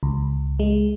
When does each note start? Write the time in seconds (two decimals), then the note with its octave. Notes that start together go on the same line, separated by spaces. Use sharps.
0.03 C#2
0.59 G#3